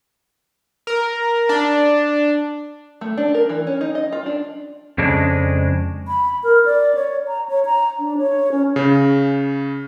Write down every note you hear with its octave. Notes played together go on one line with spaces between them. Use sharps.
A#4
D4
A3
D4
A#4
E3
C#4
D#4
D#5
F4
D4
F2 C#3 G#3 D4
B5
A#4
D5
C#5
A#5
C#5
A#5
D4
C#5
C#4
C#3